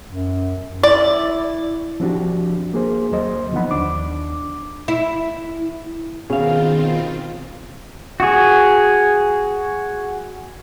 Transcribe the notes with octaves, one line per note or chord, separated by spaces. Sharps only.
F#2
E4 D5
F3 C4 D4 F#4 G4
A#3 G#4 C5
D2 F#3 A#3 C5 D#5
D3 F3 B3 D#4 F#5 B5
D#2 D4 D6
E4
B2 D#3 C4 C#4 F4 F#4 G#4 F5
F#4 G#4